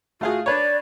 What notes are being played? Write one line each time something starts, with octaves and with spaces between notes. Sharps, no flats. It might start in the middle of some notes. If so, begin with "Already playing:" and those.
A3 F4 F#4 G#4
D4 B4 C#5 D5